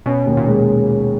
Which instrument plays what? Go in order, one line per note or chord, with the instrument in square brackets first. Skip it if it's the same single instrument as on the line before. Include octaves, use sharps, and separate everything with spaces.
[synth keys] B2 [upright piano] C#4
[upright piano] D#2
[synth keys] A#2
[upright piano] G#3